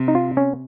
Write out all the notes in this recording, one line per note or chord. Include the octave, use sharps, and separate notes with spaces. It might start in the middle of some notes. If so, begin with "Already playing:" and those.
Already playing: C3
D#4
F4
C#4